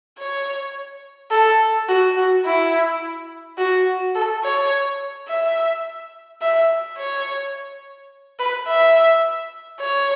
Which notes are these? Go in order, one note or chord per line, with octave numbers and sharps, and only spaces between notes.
C#5
A4
F#4
F#4
E4
F#4
A4
C#5
E5
E5
C#5
B4
E5
C#5